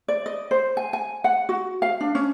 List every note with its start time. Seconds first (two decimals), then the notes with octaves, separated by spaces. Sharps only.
0.08 D5
0.26 D#5
0.51 C5
0.77 G#5
0.93 G#5
1.24 F#5
1.49 F#4
1.82 F5
2.01 D4
2.15 C#4